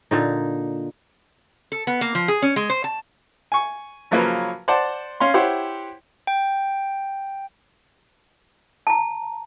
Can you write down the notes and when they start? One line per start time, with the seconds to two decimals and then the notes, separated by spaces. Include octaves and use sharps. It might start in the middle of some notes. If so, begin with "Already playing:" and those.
0.11 A#2 D3 D#4
1.72 A4
1.87 B3
2.01 A#3
2.15 F3
2.28 G#4
2.42 C#4
2.56 G#3
2.70 C5
2.84 A5
3.52 G#5 C#6
4.11 C#3 F3 F#3 A#3 C#4 B4
4.68 C5 D5 F#5 A5
5.20 C#4 F5 C6
5.34 E4 G4 C5 C#5 F#5 C6
6.27 G5
8.87 A5 A#5